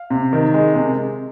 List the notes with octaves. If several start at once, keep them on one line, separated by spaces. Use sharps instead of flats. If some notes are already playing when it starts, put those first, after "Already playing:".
Already playing: F5
C3
D#3
G#3
C3